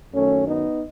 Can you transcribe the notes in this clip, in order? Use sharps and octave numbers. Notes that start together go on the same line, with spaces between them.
F#2 D#3 A3 C#4
B3 D#4